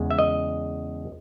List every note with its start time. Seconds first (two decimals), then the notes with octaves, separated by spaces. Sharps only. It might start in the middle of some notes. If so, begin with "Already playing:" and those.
Already playing: E2 C#3 G#3
0.11 E5
0.19 D#5